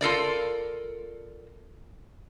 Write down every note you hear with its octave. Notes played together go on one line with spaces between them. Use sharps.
F4 A4 A#4 D5